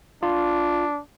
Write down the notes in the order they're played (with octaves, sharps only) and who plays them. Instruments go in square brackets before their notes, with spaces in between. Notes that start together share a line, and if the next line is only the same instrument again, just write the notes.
[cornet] D4 [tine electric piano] F4